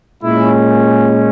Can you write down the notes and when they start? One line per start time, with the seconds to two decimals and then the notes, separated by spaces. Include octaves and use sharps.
0.23 A#2 G#3 C#4 E4